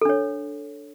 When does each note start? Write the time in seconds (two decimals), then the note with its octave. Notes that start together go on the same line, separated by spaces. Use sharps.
0.01 A4
0.05 D4
0.09 C#5